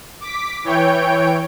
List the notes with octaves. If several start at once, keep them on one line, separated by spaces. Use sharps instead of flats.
D6 B6
E3 C#5 G5 G6 D7